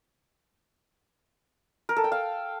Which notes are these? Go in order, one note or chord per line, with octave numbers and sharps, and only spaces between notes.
A#4
A4
G5
F5